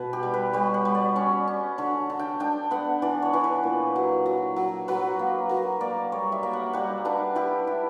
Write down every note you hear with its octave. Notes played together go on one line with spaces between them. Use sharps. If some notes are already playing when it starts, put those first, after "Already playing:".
Already playing: B2 B4
G4
G3
B4
G3 C#5
F#5
G3
D5
C#4 C#5
C#4
D3 C#5
D3
G5
D4 G5
B3 F#5
E3 D5
C#5
E3
B4
A#2
F#3
F#3
F#3
F#3 B4
A#3
F#3 A#4
A#3 D5
G3 C#5
E5
A#3
F#5
G3 F#5
D4 B4
E4 G4
E4